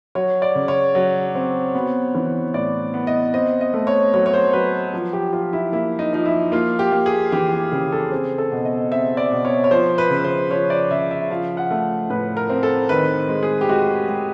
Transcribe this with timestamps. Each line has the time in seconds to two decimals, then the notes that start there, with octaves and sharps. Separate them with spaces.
0.15 F#3 C#5
0.42 D5
0.55 C#3
0.68 C#5
0.95 F#3
1.35 C4
1.75 B3
2.15 E3
2.54 A2 D5
2.94 B3
3.07 D#5
3.34 C4 D#5
3.61 D#5
3.74 A3
3.87 C#5
4.14 F#3 C#5
4.26 C#5
4.33 C5
4.53 F#3 B4
4.94 F3
5.13 G4
5.33 F3 F4
5.53 E4
5.72 A#3 E4
5.99 D#4
6.13 F3 D#4
6.26 E4
6.52 A#3 F4
6.79 G4
6.92 A#3
7.06 G#4
7.32 E3 G4
7.52 G4
7.72 C#3 G4
7.92 A4
8.12 C4 G#4
8.38 A4
8.52 B2
8.65 D#5
8.91 C4 E5
9.17 D5
9.32 B2
9.45 C#5
9.64 C#5
9.71 F3 C5
9.98 B4
10.10 C#3
10.24 C5
10.51 F3 C#5
10.70 D5
10.90 C#3 E5
11.11 E5
11.30 F3 F5
11.57 F#5
11.71 A3
12.10 A2 B4
12.37 A#4
12.50 C4
12.63 A4
12.89 D#3 B4
13.29 G#3
13.43 G#4
13.61 G4
13.69 G#3 F#4
14.09 G#3 G4